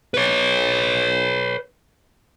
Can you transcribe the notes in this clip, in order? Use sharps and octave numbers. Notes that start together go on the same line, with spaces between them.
B4 C#5